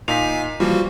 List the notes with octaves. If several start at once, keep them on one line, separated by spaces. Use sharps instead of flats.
A#2 D#4 F5 G#5 B6 F7
E3 F3 G3 A#3 F#4